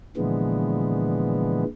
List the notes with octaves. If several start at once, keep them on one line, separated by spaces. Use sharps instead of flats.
A#2 D3 E3 F3 G#3 B3